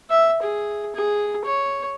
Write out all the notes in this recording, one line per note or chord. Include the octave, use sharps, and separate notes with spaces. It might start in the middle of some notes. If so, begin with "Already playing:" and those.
E5
G#4
G#4
C#5